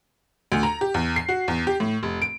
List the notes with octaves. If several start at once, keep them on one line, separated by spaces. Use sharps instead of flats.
D2
A#5
G4
E2
C7
F#4
E2
G4
A2
F1
D7